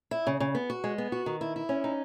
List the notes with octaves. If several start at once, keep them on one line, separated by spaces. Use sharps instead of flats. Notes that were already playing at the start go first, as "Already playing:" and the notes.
E4
C#3
C#3
B3
F#4
G#3
B3
F#4
D#3
E4
E4
C#4
D#4